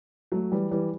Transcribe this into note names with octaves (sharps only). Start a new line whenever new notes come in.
F#3 A3
E3 G3
E3 G3